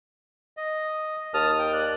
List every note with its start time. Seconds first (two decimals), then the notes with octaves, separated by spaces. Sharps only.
0.57 D#5
1.34 D#2 A5 D#6 F6
1.59 G5
1.73 D5 F#6